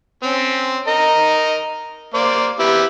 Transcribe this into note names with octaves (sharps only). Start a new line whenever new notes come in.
C4 C#4
A#4 D#5
A#3 C5 D5
B3 E4 G4